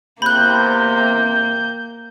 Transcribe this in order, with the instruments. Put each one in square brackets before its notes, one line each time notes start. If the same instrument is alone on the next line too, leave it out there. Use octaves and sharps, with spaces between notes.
[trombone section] E2 C3 [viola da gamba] A#3 [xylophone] B5 F#6 [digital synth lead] G6